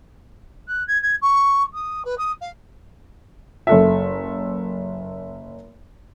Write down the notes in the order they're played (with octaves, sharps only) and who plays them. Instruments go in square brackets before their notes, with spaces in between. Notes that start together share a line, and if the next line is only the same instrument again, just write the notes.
[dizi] F#6
G#6
G#6
C#6
D#6
B4
D#6
F5
[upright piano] F#1 A4 E5